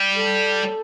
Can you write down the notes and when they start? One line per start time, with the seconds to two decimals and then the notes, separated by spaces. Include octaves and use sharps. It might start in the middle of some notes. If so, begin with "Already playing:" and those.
Already playing: G3
0.15 A4